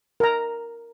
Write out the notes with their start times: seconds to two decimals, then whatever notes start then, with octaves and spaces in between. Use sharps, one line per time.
0.20 A#4 A#5